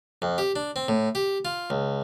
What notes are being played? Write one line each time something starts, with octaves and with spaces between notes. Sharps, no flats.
F2
G4
D4
C4
A2
G4
F4
C#2